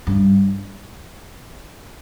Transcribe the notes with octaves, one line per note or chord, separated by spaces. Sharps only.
G2